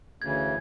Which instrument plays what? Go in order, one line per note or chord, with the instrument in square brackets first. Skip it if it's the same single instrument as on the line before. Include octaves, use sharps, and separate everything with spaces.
[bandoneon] D2 C#3 E3 [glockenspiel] G#6